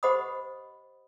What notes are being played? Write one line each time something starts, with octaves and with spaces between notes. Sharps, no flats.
G4 C5 D#5 F#5 B5 D#6